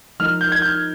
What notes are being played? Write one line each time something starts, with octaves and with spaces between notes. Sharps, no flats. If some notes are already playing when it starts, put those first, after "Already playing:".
F3 G#3 D#4 A#4 F6
G6
G#6
G6